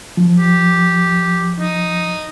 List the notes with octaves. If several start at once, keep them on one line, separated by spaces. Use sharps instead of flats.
F3
G4
D#4